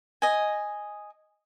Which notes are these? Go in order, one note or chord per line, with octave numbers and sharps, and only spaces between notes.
D#5 G#5